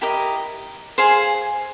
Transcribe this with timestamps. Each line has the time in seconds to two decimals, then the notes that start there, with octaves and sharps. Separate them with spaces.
0.01 E4 G4 A#4 D#5
0.98 G#4 C5 F5 G#5